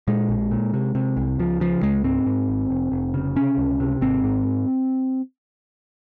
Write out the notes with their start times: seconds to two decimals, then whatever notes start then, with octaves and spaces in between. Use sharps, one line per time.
0.08 A#2 G#3
0.29 A#1
0.51 A#2
0.74 C3
0.95 C3
1.17 C2
1.39 C#2 F3
1.60 C#3 F3
1.82 C#2 G#3
2.04 G#2 C4
2.26 G#2
2.49 G#1
2.70 F1
2.92 F1
3.14 C#3
3.36 C3 C#4
3.58 C#2
3.80 C3
4.01 G#1 C4
4.24 G#2